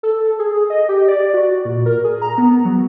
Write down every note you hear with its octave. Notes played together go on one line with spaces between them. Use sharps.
A4
G#4
D#5
G4
D5
F#4
A#2
A#4
G#4
A#5
B3
F#3